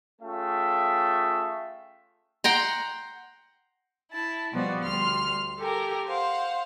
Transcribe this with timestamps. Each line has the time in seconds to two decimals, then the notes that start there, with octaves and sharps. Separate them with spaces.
0.21 A3 C#4 F4 G#4 E5 G5
2.44 F#5 G5 A#5 C6
4.11 E4 A5
4.52 B2 F3 G3 B3 F#4 D5
4.83 D2 G3 C6 F6
5.58 G4 A4 A#4 G#5
6.07 C5 F5 F#5